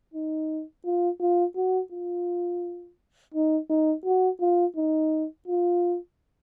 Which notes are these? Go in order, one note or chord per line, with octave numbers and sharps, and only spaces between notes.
D#4
F4
F4
F#4
F4
D#4
D#4
F#4
F4
D#4
F4